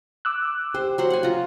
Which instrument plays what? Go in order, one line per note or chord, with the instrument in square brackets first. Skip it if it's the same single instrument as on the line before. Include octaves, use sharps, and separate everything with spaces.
[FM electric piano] D6 E6 F#6
[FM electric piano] G4 [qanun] C5
[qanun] F#3 C5 F#5
F#5 G#5
F4 A#5